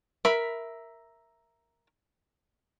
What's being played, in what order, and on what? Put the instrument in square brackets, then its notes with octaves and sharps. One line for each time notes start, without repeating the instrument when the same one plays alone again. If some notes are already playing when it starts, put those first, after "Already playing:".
[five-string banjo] A#4 E5 B5